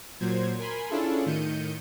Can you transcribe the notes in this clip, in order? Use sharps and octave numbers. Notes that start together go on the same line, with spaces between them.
A#2 F#3 C5 G#6
A#4 G#5 B5 C6
C#4 D4 E4 F4 G#4 A4
A2 D#3 G6 C#7 D#7